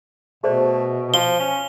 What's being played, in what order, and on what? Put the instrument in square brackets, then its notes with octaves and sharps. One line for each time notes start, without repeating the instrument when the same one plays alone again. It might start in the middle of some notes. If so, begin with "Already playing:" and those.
[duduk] B2 [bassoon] A3 [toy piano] G#4 C5 D5
[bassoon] F3 [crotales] G7
[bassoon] C#4